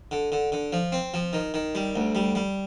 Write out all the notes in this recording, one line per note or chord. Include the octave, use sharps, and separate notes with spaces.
D3
D3
D3
F3
C4
F3
D#3
D#3
G3
D2
G3
G3